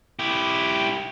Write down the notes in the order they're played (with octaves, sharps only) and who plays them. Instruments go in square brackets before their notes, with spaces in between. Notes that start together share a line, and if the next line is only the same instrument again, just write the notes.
[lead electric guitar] E4 G4